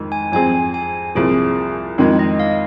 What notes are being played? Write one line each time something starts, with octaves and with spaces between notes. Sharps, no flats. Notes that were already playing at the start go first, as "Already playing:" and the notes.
Already playing: F2 D#3 G#3
G#5
F2 F3 C4 G#4 G#5
G#5
C2 A#2 F3 G#4
F2 D#3 G#3
D#5
F5